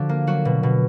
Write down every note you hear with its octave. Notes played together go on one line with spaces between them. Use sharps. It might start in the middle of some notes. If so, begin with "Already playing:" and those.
Already playing: D3 F3 D4 F#4
A#3
F#3 F#4
B2
B2